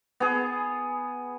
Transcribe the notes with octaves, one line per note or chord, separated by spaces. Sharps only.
B3 G#4